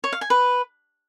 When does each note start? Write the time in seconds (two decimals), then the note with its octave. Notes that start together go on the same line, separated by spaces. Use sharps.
0.04 C#5
0.13 F5
0.21 G#5
0.30 B4